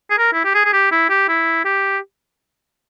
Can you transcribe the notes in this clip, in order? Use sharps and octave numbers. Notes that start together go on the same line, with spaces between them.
G#4
A#4
E4
G4
G#4
G#4
G4
E4
G4
E4
G4